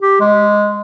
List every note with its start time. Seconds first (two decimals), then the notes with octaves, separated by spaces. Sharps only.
0.02 G4
0.20 G#3